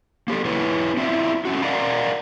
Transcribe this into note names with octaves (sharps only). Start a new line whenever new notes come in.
A#3 G4 A4
B3 E4 B4 C#5
C4 E4 F4 E5
A3 C#4 F#4
A#4 D5 D#5 F5 F#5 A#5